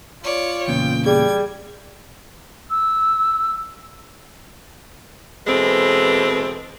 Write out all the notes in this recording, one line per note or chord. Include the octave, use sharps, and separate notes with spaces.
F4 C#5 D5
E2 A#2 C#3 G5
G3 G#4 G#6
E6
B2 E3 G#3 C4 A4